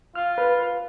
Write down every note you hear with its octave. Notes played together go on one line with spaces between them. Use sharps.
F4 F6
B4